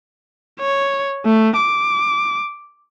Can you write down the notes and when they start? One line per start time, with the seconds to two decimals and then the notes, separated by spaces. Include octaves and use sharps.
0.60 C#5
1.25 A3
1.56 D6